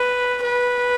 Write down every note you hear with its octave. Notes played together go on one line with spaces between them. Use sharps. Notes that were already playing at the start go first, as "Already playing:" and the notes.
Already playing: B4
B4